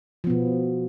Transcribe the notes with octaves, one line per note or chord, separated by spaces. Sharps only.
B2 F3 B3